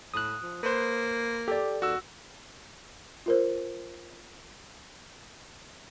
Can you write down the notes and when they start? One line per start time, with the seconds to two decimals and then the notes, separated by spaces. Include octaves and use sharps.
0.14 A2 D#6 F#6
0.43 F3
0.63 A#3 B4 C5
1.48 G4 A4 D5
1.82 D#2 F#4 E6
3.26 F4 A#4 C5